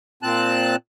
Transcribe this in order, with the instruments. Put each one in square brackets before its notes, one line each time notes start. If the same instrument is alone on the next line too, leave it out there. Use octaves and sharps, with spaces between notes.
[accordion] A#2 C4 A5 F#6